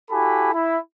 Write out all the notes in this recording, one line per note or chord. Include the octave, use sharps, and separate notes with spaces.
E4 F#4 G4 A4 G#5 B5
E4